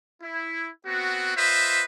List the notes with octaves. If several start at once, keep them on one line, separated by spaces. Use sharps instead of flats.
E4
B3 C4 F#4
F4 B4 C5 D#5 E5